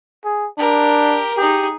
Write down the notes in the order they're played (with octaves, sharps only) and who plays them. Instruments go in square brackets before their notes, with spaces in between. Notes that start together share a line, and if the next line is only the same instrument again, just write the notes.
[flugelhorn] G#4
[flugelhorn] D4 [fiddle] G4 A#4
[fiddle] D#4 G#4 [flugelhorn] G4